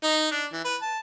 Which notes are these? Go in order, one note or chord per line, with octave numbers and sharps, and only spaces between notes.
D#4
D4
E3
B4
A5